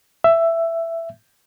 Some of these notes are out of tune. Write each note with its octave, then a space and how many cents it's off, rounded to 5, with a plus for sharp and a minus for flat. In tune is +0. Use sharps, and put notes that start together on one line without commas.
E5 +10